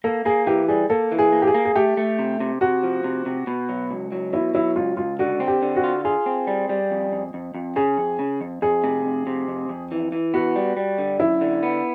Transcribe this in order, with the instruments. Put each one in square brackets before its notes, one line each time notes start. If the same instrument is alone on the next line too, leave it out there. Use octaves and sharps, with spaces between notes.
[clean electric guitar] A#3 [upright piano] A4
[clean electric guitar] A#3 [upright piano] G#4
[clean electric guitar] E3 [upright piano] G4
[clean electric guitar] G3 [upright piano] G#4
[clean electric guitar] A#3 [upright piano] A4
[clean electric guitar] E3
[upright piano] G#4
[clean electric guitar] A#3
[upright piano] G4
G#4
[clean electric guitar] A#3
[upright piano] G#4
[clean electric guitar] A3 [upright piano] G4
[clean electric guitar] A3
C3
C3
[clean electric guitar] C3 [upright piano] F#4
[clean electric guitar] F3
C3
C3
B2
F#3
C#2
F#3
[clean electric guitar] B2 [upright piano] E4
[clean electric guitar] F#3 [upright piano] E4
[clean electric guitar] C#2 [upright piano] F4
[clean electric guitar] C#2 [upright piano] F4
[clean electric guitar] D3 [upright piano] F#4
[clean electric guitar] C4
[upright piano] G4
[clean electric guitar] D3
[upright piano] F#4
[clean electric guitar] F4
[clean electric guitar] F4 [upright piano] G#4
[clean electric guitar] C4
G3
G3
F2
F2
F2
F2
[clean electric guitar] C#3 [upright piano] G#4
[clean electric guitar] F2
C#3
F2
[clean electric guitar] F2 [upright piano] G#4
[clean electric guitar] C3
F2
C3
F2
F2
E3
E3
[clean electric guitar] B3 [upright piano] F#4
[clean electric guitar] G3
G3
D3
[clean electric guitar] F#2 [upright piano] E4
[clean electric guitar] D3
B3